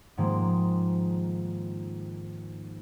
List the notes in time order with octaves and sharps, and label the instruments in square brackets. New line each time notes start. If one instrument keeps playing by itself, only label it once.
[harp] G#2 D#3 F3 G#3 A#3